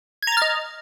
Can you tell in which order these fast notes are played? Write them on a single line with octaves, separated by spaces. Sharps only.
G#6 A#5 A6 F6 D#5